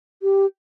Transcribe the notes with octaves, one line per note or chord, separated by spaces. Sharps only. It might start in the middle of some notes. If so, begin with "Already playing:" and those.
G4